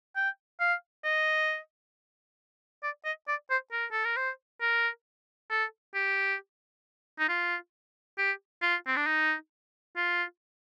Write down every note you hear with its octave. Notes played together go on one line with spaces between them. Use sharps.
G5
F5
D#5
D5
D#5
D5
C5
A#4
A4
A#4
C5
A#4
A4
G4
D#4
F4
G4
F4
C4
D4
D#4
F4